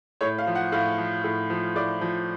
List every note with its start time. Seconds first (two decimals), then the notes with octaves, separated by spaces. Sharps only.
0.21 A2 C#5
0.39 F5
0.47 F3
0.55 F#5
0.72 A2 F5
0.98 F3
1.24 A2
1.50 F3
1.76 A2 D5
2.01 F3